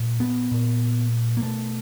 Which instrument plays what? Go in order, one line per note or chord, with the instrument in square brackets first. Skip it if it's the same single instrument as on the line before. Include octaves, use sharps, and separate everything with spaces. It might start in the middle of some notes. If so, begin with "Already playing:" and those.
Already playing: [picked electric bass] A#2
B3
A#2
A#3
B2 A3